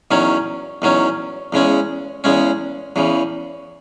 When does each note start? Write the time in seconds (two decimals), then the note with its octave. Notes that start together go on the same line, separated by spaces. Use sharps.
0.11 E2 D#3 F#3 C#4
0.82 E2 D#3 F#3 C#4
1.53 E2 C#3 G#3 C#4
2.24 E2 C#3 G#3 C#4
2.96 E2 C#3 E3